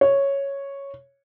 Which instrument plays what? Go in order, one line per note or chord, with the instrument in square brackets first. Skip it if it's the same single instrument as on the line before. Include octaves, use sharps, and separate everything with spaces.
[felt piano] C#5